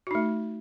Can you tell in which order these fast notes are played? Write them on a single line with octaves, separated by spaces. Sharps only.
F#4 D#4 A3